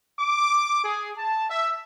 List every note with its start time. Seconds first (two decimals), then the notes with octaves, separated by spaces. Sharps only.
0.20 D6
0.84 G#4
1.18 A5
1.50 E5